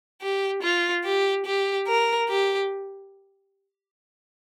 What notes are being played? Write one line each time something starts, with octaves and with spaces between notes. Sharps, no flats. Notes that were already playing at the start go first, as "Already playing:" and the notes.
G4
F4
G4
G4
A#4
G4